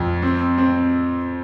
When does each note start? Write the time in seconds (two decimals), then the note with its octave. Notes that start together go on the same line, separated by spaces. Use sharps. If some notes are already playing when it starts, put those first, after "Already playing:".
Already playing: F2
0.22 C4
0.58 C4